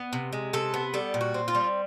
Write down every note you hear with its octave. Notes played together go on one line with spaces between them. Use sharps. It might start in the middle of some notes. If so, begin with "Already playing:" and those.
Already playing: B3
C3
G#3
C3 A4
B3
G3 A4
A#2
F#4
C4
F4
G3